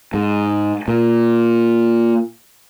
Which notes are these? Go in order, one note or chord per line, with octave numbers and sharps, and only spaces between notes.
G#2
A#2